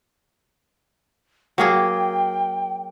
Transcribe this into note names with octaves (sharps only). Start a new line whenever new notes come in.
F#3 A#3 G#4 G5